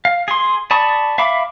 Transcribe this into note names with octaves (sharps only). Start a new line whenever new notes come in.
F5
G#4 C6
D5 A5 B5 C#6 D#6
E5 F5 B5 D6